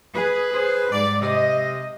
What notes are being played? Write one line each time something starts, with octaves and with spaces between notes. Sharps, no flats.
G#4 B4
G#4 C5
G#2 G3 D5
C3 D#5